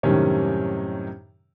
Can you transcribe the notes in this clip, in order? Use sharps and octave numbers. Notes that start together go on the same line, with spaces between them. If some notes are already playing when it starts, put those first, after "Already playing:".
F#2 A2 C3 D#3 G3 C#4